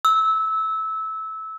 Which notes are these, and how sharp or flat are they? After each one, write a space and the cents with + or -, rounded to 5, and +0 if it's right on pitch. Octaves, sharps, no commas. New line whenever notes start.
E6 -20